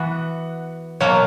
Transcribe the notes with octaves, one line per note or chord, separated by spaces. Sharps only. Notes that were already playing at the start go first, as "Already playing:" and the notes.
Already playing: E3 B3 F#4 F#5
B2 F#3 A#3 C#5